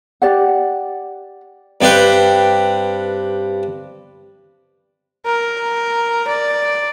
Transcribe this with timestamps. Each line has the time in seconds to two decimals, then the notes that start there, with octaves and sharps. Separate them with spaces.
0.22 G4 D5 F#5
1.81 G2 C4 D4 G4 B4
5.26 A#4
6.28 D5